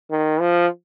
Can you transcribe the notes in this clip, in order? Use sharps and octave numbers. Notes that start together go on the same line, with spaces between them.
D#3
F3